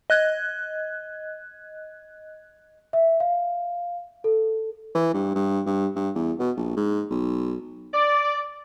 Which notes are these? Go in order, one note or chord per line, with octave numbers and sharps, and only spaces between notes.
D#5 F#6 G#6
E5
F5
A4
E3
G2
G2
G2
G2
E2
B2
A#1
G#2
B1
D5